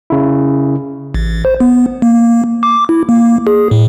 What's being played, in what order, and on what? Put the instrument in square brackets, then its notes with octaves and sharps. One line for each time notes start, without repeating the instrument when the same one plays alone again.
[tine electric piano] C#3 E4
[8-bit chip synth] A1
C5
B3
A#3
D6
E4
A#3
G#4
A2